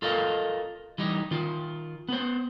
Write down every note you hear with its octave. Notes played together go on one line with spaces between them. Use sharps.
F4 A4 A#4 D#5 F5
E3 G3 D#4
D#3 F4
B3 C5